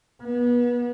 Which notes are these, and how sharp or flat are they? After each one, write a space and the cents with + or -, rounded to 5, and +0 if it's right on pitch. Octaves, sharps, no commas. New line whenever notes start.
B3 -30